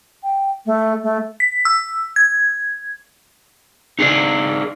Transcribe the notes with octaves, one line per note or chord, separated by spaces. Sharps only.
G5
A3
A3
B6
E6
G#6
D#4 G#4 A#4 D5